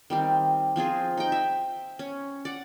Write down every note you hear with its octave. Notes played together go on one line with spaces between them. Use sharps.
D#3 G3 C4
F3 C4 F4 G#4
D#4 G5
E5
C#4
D5 F#5